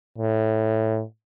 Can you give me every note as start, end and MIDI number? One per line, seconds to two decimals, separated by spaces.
0.18 1.03 45